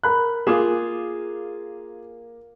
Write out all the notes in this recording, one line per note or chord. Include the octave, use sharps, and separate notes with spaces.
A#4 B5 F#6
A#3 F4 G#4 D6 E7